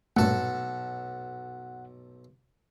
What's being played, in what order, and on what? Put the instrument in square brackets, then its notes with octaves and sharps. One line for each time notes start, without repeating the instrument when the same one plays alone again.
[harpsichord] B1 A4 [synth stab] G2 A#2 A3 [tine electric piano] F#5